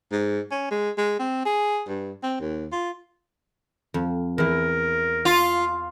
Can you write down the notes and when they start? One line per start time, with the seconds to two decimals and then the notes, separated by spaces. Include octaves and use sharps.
0.11 G#2
0.51 C#4
0.71 G#3
0.98 G#3
1.19 C4
1.45 G#4
1.88 G2
2.23 C4
2.40 D#2
2.72 F4
3.94 F2
4.38 E2 E4 A#4
5.25 F4